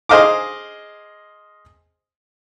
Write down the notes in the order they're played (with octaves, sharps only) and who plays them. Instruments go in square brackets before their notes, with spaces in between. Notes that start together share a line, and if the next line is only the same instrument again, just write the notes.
[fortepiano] G#4 C5 D#5 F5 A#5 D6